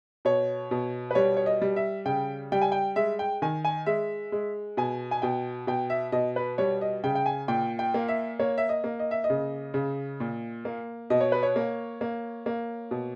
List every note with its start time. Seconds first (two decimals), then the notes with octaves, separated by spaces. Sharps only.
0.25 B2 C#5
0.71 B2
1.11 B4
1.15 G3 C#5
1.37 C#5
1.46 D#5
1.62 G3
1.76 E5
2.06 C#3 G5
2.52 G3 G5
2.62 G#5
2.72 G5
2.96 G#3 E5
3.19 G5
3.42 D#3 G#5
3.65 G#5
3.86 G#3 E5
4.32 G#3
4.77 B2 G#5
5.11 G#5
5.22 B2 G5
5.67 B2 G5
5.90 E5
6.12 B2 D#5
6.36 B4
6.58 G3 C#5
6.81 D#5
7.04 C#3 G5
7.15 G5
7.26 G#5
7.48 A#2 G5
7.79 G5
7.94 A#3
8.08 E5
8.39 A#3 C#5
8.58 E5
8.69 D#5
8.84 A#3
8.99 D#5
9.11 E5
9.24 D#5
9.30 C#3
9.74 C#3
10.20 A#2
10.65 A#3
11.10 B2 D#5
11.21 C#5
11.32 B4
11.43 C#5
11.56 A#3
12.01 A#3
12.46 A#3
12.91 B2